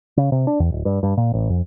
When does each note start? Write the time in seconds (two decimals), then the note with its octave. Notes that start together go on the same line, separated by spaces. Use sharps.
0.17 C#3
0.32 C3
0.47 D4
0.60 E2
0.72 D1
0.85 G2
1.03 G2
1.17 A#2
1.34 A1
1.50 F2